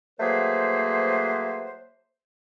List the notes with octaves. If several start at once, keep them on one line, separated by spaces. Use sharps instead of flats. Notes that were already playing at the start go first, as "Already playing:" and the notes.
F#3 A3 A#3 G#4 B4 C5